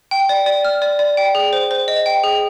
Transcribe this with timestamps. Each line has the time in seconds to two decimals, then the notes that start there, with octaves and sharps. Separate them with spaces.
0.11 G5
0.29 D5
0.46 D5
0.65 F6
0.82 D5
0.99 D5
1.17 G5
1.35 G#4
1.53 C5
1.71 C5
1.88 D#5
2.06 G5
2.24 G#4